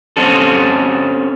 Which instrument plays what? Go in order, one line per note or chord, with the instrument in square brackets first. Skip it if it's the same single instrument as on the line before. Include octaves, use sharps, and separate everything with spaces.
[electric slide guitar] C4 C#4 A4